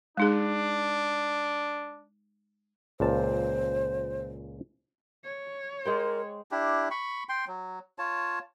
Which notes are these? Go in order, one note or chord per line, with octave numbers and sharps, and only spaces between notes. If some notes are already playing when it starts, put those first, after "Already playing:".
G#3 D4 D#4 G#4
C#2 A#2 C5 A5
C#5
G#3 A#4 C5 G5
D4 E4 G4
B5 C#6
G5 C6
F#3
F4 C#5 A5